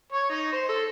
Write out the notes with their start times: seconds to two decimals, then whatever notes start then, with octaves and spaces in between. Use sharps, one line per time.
0.12 C#5
0.30 D#4
0.53 C5
0.69 A4